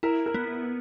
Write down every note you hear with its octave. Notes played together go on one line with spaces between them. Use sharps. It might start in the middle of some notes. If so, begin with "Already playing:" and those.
E4 A#4
A#4
B3